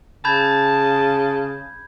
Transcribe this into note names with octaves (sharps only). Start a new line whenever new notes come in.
C#3 A5 B5 G6 G#6